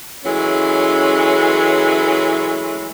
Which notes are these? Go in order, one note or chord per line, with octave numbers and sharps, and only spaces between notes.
E3 F#3 G#3 A3 C#4